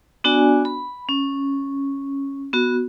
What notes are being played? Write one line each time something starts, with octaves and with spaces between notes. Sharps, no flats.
B3 D4 F#4 D5 G#5
B5
C#4
B3 F#4